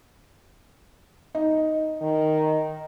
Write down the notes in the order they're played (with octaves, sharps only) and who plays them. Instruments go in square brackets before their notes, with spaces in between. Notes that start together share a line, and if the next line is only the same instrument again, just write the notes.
[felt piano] D#4
[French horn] D#3